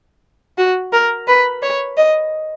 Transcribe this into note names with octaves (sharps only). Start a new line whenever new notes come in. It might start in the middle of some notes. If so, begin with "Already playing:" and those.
F#4
A#4
B4
C#5
D#5